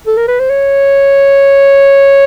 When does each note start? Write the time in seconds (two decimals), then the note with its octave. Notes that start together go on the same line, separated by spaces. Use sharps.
0.07 A4
0.17 A#4
0.28 B4
0.39 C5
0.50 C#5